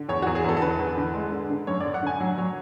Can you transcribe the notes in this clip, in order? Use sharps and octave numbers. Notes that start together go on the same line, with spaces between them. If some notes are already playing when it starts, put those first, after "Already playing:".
Already playing: D3
E2 C#5
E2 F#4
G#4
E2 A4
A4
D3 B4
E2
D3
G#3
D3
D3
F#2 C#5
D3 D5
F#5
D3 G#5
F#3 F#5
F#3 C#5